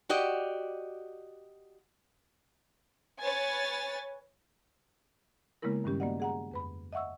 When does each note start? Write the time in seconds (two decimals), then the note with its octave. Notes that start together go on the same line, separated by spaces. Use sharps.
0.09 F#4 G4 D5 D#5
3.22 B4 C#5 G#5 A6
5.62 C#3 G#3 A#3 B3 E4 A#4
5.84 G2 D#3 G3 C#4 G4
6.00 A#3 B3 F#4 D5 D#5 F#5
6.20 G#4 F#5 A#5
6.51 F2 B4 B5
6.93 D#5 E5 F#5 C#6 E6